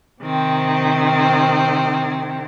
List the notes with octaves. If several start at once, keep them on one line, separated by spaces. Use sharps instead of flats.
C3 D#3 C4